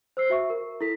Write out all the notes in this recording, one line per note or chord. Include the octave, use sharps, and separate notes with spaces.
C5 E6 C7
F#4 E5 C#6
A#4
E4 A4 B6